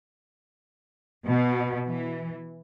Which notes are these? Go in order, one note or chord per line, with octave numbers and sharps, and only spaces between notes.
B2
E3